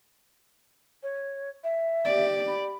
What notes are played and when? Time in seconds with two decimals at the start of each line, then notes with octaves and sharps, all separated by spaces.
1.03 C#5
1.64 E5
2.05 G4 D5
2.47 B5